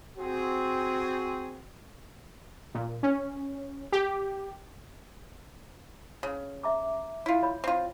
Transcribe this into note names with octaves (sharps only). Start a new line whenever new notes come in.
C4 F#4 G#4
A#2
C#4
G4
C#3
E5 A#5 D6
E4 F4
C#5 B5
C4 F4